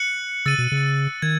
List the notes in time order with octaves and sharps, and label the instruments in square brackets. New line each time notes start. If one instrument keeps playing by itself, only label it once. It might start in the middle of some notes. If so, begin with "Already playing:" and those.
Already playing: [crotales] F#6 C#7 F#7
[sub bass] C#3 [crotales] E6 A6 D#7
[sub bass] B2
C#3
[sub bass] D#3 [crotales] G#6